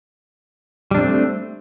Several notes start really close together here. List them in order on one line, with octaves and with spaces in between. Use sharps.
G3 D4 C4 A3